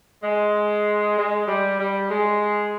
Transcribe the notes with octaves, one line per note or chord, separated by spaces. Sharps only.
G#3
G#3
G3
G3
G#3